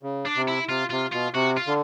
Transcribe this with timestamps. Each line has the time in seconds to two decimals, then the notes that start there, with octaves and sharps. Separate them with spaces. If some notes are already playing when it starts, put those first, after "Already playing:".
0.03 C#3
0.25 D4
0.36 C3
0.47 E4
0.68 C3 F4
0.90 C3 F4
1.12 B2 F4
1.34 C3 F#4
1.57 F4
1.67 D3